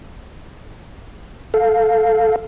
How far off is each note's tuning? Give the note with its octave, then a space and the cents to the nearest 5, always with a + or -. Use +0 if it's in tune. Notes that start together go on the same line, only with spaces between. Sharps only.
A4 +0 F5 +0